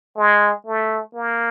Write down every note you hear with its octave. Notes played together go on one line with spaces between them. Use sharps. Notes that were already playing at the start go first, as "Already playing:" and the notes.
G#3
A3
A#3